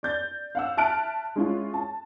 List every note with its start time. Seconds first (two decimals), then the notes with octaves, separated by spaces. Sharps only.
0.03 D5 G6 A6
0.55 F5 F#5 E6
0.77 E5 A5 F6 F#6 D7
1.36 G#3 C#4 E4 F4
1.74 A5